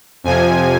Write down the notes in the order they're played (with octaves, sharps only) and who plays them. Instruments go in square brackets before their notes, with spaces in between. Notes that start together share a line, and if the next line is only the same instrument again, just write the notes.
[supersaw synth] F2 C3 F3 G#5